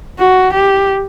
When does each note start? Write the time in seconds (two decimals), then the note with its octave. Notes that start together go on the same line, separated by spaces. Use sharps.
0.19 F#4
0.53 G4